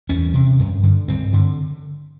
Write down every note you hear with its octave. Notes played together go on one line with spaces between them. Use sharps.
E2 C#4
C3
G2
D3
G2 C4
D3